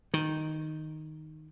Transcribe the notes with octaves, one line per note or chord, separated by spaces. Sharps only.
D#3